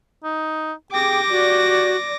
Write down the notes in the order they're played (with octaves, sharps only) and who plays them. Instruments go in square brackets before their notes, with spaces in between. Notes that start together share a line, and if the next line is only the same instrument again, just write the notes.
[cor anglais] D#4
[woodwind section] C4 G#4 [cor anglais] G4 [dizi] G5 [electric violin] D6 A#6
[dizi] F#4 [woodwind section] D5